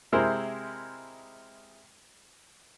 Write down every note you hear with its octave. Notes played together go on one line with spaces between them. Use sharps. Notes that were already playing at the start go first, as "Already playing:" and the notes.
C3 G#3 E4 G#4 A#4 C5